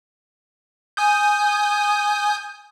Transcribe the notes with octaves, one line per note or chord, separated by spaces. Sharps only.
G#5 D#6 G6